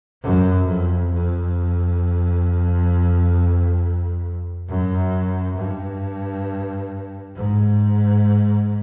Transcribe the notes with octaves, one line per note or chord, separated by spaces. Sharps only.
F#2
F2
F2
F#2
G2
G#2